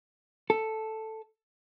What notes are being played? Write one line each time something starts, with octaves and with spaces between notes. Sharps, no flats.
A4